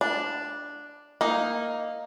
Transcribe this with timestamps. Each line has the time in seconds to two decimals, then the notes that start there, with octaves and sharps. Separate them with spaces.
0.01 D4
1.21 A#3 D#4